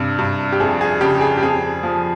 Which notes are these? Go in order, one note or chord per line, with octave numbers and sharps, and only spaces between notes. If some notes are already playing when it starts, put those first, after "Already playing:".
Already playing: G2 C3
G2
G4
F2 G#4
G#4
C#3 G4
G#4
G4
F2 G#4
F3